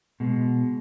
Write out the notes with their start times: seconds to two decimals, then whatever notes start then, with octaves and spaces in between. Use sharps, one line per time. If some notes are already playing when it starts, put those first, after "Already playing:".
0.20 B2 G#3